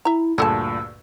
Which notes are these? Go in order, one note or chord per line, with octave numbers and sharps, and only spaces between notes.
E4 E5 A#5
D2 G2 A#2 G#4 A4 A5 E6